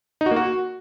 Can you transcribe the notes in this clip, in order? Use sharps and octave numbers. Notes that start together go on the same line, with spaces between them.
D#4
F#4
A#3
F#4